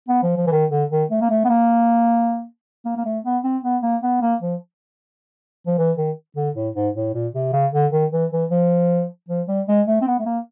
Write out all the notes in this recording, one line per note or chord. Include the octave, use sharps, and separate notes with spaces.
B3
F3
F3
E3
D#3
D3
D#3
A3
A#3
A3
B3
A#3
A#3
A#3
A3
B3
C4
B3
A#3
B3
A#3
F3
F3
E3
D#3
D3
A2
G#2
A2
A#2
C3
C#3
D3
D#3
E3
E3
F3
F3
G3
G#3
A3
C4
B3
A3
A#3